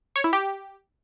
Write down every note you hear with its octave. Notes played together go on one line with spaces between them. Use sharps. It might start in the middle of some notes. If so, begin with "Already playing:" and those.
C#5
E4
G4